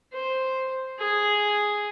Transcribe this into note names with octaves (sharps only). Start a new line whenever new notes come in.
C5
G#4